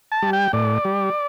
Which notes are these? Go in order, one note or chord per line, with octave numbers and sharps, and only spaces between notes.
A5
G3
G5
A2 D5
G3